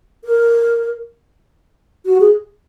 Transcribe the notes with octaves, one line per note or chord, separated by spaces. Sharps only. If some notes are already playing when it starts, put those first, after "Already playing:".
A#4
F#4
G#4